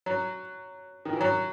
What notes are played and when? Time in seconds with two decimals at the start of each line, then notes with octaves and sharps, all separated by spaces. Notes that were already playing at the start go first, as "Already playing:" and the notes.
0.06 F#3
1.05 D#3
1.13 E3
1.21 F#3